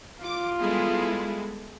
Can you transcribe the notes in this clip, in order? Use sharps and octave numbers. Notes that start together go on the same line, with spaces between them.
F4 D6
G3 G#3 B3 E4 G#4 A4